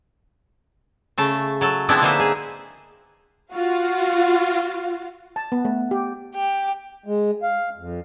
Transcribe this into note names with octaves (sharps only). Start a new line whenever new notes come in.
C#3 A3 A5
F#3 A4
F3 G#3 B3 C4 D4 E4
D3 A#3 D#4 B4 C5 E5
G#4
F4 F#4 F5
A5
B3
A3
G4
G4
G#3
F5
F2